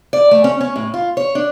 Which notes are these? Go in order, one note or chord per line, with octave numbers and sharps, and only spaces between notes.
D5
A3
C#4
C#4
A2
F4
C#5
D4